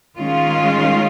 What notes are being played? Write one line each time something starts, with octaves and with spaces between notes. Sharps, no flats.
D#3 G#3 C#4 F4